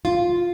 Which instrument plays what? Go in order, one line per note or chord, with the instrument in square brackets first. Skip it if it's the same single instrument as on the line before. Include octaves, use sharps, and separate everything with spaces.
[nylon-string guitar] F4